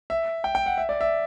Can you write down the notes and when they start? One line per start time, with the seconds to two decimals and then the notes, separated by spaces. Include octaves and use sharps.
0.10 E5
0.44 G5
0.55 G5
0.66 F#5
0.78 E5
0.89 D5
1.01 E5